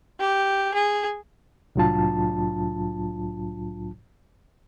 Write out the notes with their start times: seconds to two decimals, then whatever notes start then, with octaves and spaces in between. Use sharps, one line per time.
0.20 G4
0.74 G#4
1.75 C2 A2 F#3 D4 F4 A5